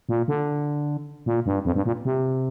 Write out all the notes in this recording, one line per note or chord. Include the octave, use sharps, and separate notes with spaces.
A#2
D3
A#2
G2
F2
G2
A#2
C3